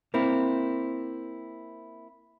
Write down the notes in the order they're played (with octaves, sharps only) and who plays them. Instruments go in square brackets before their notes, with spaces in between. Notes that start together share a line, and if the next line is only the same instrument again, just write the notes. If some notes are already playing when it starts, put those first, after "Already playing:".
[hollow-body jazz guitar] A#3 C4 E4